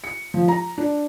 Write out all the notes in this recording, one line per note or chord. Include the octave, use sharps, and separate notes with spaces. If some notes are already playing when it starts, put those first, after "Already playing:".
C#7
F3
A#5
D4